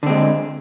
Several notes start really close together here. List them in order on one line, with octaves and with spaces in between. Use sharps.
D3 C4 G#3